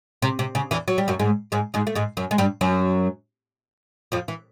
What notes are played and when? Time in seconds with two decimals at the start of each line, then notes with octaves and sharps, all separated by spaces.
0.22 C3
0.39 C3
0.55 C#3
0.71 E2 E3
0.88 F#3
0.98 G3
1.08 F#2 F#3
1.19 G#2 G#3
1.52 G#2 G#3
1.74 G#2 G#3
1.87 A3
1.95 G#2 G#3
2.17 F#2 F#3
2.31 G#3
2.38 G2 G3
2.61 F#2 F#3
4.12 F2 F3
4.28 E3